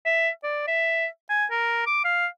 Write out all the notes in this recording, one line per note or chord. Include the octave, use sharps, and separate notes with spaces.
E5
D5
E5
G#5
A#4
D6
F5